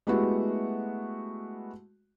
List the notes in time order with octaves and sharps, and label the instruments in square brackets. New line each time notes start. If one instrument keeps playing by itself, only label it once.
[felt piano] G#3 A3 B3 E4 F#4 G4